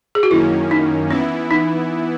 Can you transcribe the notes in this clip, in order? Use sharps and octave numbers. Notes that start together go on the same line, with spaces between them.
G#4
F#4
F#2 D#3 A#3 C#4 E4
D#4
E3 B3 C#4 E4
D#4